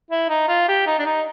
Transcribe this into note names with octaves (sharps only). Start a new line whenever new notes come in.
E4
D#4
F4
G4
D#4
D4
D#4